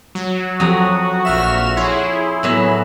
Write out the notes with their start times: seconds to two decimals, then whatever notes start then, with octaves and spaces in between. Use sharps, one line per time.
0.15 F#3
0.60 F2 F#4 A#5 D#6
1.25 A#1 E5 F6 E7
1.77 E4 G#4 C#5 C6
2.43 A2 F#3 B3 E5